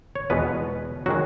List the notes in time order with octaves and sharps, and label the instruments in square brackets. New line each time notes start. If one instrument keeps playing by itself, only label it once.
[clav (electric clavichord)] C#5
E2 B2 G#3 B3 B4
D#3 F#3 G#3 F#4